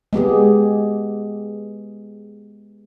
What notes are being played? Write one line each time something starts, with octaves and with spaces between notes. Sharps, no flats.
G#3 B3 G4 G#4